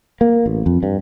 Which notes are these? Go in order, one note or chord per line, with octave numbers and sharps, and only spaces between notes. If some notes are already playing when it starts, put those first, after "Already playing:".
A#3
A1
F2
G2